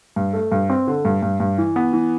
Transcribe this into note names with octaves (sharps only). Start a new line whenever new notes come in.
G2
A3
G2
C4
D3
G2
G2
G2
E3
B3
E3